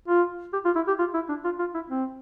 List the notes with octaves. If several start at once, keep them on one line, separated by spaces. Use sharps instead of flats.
F4
G4
F4
E4
G4
F4
E4
D4
F4
F4
E4
C4